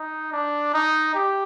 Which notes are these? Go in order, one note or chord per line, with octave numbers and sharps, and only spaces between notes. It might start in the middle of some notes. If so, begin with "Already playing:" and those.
Already playing: D#4
D4
D#4
G4